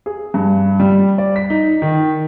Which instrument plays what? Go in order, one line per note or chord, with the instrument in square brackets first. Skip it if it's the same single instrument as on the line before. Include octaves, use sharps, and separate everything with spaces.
[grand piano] G#4
G2
G3
D5
B6
D#4
D#3